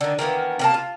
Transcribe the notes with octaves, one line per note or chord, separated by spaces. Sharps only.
D3 D#3
D#3 E3 A#3 B3
C3 A#3 A5
F4